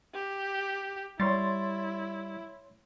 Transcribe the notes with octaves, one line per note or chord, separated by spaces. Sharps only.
G4
G3 E4 C#5 C6 A6